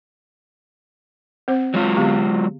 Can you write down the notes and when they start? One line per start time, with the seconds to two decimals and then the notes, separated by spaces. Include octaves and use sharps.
1.48 C4 C5
1.74 F#3 G#3 F4
1.96 D3 B3 G4